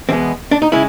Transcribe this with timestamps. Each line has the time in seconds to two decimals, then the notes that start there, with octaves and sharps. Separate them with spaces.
0.09 E2 B2 G#3 B3 C4
0.51 D4
0.62 D#4
0.72 C#3 G#3 E4